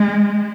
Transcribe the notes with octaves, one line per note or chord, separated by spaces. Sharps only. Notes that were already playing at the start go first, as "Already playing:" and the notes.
Already playing: G#3